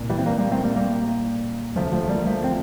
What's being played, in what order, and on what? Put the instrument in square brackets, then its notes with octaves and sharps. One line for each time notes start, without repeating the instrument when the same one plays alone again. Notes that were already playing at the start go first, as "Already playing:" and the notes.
Already playing: [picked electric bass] C2 A#2
E3 G3
C4
G3 A#3
G3 A#3
A3 C4
G3 A#3
G3 A#3
D2 C3 F3 A3
F3 A3
G3 A#3
F3 A3
C4